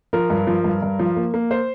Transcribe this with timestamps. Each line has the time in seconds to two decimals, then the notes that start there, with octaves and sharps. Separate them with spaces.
0.13 F3 A#4
0.30 G2
0.47 F3
0.64 G2
0.82 G2
0.99 F3
1.16 A#3
1.34 A#3
1.51 C5